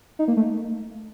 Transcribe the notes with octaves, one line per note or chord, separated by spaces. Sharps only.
D#4
A#3
A3